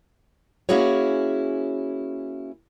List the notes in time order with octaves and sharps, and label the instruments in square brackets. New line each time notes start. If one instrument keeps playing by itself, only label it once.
[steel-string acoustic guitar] A#3 C#4 E4 F#4 G#4 C#5